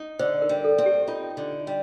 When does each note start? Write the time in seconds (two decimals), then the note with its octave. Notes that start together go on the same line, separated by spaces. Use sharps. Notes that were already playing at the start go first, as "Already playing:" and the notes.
Already playing: D#4
0.19 D3 C5
0.42 A#4
0.49 G3
0.64 A4
0.78 C4
0.86 G4
1.08 D#4 F4
1.37 D3
1.67 G3